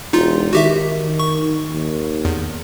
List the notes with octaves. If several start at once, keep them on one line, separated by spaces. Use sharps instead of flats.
E1 D#4 F4
D#3 F#4 G4 E5
C#6
D#2
E2